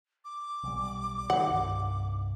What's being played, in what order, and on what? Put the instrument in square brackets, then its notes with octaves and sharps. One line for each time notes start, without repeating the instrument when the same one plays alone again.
[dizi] D6
[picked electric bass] B1 G3
[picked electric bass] D#3 [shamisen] F#5
[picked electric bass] C2 G2